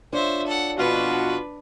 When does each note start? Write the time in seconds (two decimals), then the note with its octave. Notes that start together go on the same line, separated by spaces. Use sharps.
0.13 D4 F4 C5 C#5 E5
0.46 A4 F#5
0.78 F2 B2 D4 F4 F#4 B4 A5